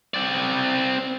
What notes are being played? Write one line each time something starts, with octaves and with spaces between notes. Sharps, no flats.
C4 D5